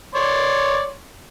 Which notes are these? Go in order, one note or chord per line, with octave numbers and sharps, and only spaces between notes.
C#5 D5 C6